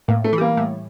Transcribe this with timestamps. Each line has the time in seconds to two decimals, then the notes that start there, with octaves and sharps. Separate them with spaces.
0.08 A2 A#3
0.24 A3
0.33 E3
0.38 G3 A#3
0.57 A2